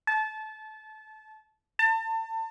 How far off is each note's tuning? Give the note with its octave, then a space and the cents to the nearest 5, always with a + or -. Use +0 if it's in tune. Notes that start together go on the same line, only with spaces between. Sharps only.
A5 -25
A5 +30